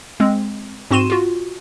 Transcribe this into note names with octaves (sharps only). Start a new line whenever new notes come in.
G#3 C4
G#2 C4 F#4 C6 D#7 E7
F4 F#4